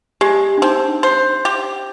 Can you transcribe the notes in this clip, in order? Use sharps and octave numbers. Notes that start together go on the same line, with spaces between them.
G#3 G4
D4
C4 D#4
C5
G4